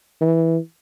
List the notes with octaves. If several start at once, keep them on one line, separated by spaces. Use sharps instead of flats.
E3